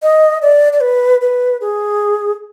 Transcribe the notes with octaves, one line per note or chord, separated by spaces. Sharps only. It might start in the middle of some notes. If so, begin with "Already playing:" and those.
D#5
D5
D5
B4
B4
G#4